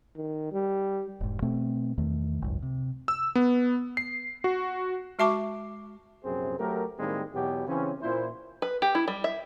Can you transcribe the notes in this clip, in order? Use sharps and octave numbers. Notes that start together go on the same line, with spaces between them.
D#3
G3
E1 G#2
B2 A3 C4
E2 D#3 A3
G#1 C#2 F#2
C3
E6
B3
C7
F#4
G#3 F#4 E5 A5 C#6 D6
A#1 F#2 C3 C4 G#4 C5
F#3 A3 G4 A#4
A2 D#3 G3 G#3 A#3 C4
E2 B2 F#3 B3 G4
C#3 E3 C4 C#4
A#2 E4 C5
B4
G4
E4
G3
E5